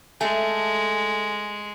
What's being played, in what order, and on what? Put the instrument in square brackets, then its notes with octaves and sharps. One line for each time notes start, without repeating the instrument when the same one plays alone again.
[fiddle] G#3 [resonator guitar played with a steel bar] A3 [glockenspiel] G#5